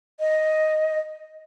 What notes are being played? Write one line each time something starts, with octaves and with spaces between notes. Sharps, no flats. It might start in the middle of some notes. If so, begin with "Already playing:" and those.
D#5